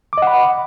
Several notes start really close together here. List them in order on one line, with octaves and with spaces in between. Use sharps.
D6 D#5 F#5 B5